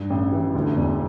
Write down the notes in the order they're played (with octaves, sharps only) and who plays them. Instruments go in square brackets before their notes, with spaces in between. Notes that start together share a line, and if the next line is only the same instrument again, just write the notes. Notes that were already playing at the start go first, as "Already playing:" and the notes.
Already playing: [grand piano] G2
A1
E3
D2
E1